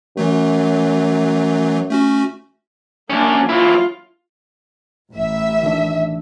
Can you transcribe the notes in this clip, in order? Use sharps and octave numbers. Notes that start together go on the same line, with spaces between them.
F#2 E3 F#3 A3
A3 C#4 F#4
F#2 A#3 C#4 D4
F#3 E4 F4
A1 E5
D#3 E3 D4